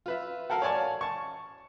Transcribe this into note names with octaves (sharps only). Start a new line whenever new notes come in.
F4 B4 E5
F#4 A4 A#4 F5
C#5 D5 G#5 A5 C#6
A5 C#6